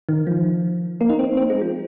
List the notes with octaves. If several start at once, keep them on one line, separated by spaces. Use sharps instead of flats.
D#3
F3
A#3
D#4
C4
C4
G#3
F3